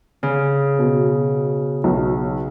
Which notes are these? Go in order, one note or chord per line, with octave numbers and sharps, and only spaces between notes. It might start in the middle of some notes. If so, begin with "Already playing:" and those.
C#3
B2
B1